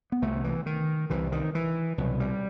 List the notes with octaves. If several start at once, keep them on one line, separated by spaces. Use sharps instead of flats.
B3
C2 C3 A3
E3
D#3
C2 C3 E3
D#3
E3
C2 B2 F#3
G3